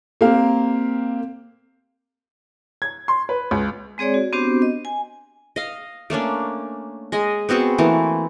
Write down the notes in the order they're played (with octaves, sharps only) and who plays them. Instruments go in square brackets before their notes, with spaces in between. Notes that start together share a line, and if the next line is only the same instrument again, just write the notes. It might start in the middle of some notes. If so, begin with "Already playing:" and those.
[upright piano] A#3 C4 G4 F5
[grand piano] G#6
C6
B4
C#2
[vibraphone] G#3 C4 G#4 C#5 D5
F#4
B3 C4 D4 F#4 G4 C5
D#5
G#5
[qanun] D#5 F5
A3 A#3 C#4 D4
G#3 D#5 G#5
B3 C4 F#4 G#4
E3 A3 A#3